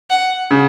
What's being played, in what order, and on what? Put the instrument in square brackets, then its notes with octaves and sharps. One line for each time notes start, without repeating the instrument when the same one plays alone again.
[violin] F#5
[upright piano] C#3